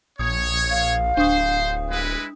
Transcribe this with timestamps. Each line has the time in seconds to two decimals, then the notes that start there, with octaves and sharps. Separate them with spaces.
0.19 A#1 C#5 D#6
0.71 F5
1.17 D1 D4 C5 D#6
1.91 G#3 E4 B4